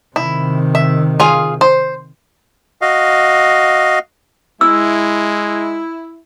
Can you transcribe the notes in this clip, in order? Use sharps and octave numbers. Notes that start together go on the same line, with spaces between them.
C3 D#3 E4
E5
F4 G#4 F5
C5
F#4 D#5 F5
G#3 E4 E6